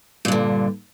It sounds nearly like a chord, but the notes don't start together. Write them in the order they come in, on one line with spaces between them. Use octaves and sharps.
A#2 G2 D3